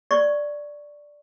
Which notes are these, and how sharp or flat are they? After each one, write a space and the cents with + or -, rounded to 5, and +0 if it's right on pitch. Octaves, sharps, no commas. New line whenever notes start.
D5 +0 C#6 +0